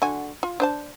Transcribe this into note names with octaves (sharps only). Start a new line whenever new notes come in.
D3 F#4 G#5
F4
D4 C5 A5